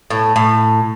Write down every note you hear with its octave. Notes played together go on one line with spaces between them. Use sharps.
A2
A2